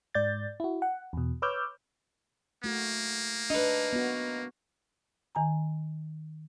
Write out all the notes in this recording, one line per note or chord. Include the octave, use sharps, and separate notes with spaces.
G#2 D5 G6 A6
E4 F#4
F#5
E2 B2
B4 C#5 D6 E6 F6 G6
A3 A#3 F#4
D4 D#4 B4
B3 F#4
D#3 G#5 A#5